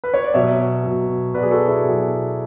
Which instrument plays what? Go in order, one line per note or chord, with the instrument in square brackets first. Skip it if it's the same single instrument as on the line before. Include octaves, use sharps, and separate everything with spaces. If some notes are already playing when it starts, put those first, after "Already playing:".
[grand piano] B4
C#5
D5
B2 F#3 C#5 E5
B2 F#3
B2 F#3 B4 D5
G#4
F#4 A4
E4 G#4
B2 F#3